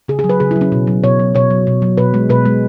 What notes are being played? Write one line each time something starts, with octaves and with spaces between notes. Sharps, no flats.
C#3 G#4
G#4
F#3
B4
C#3 G#4
E4
F#3
C#4
B2
F#3
B2 C#5
F#3
B2 C#5
F#3
B2
F#3
B2 B4
G#3
B2 B4
G#3